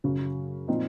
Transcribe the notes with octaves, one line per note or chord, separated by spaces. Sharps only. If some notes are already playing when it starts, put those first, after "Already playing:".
F#2 C#3 F#3 C#4
A#2 F3 C4 D#4